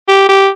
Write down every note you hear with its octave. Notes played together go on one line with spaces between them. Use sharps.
G4
G4